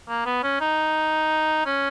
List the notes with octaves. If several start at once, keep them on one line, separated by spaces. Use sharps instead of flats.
A#3
B3
C#4
D#4
C#4